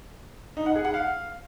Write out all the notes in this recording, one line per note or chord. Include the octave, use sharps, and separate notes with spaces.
D#4
F#5
G#4
F#5
F5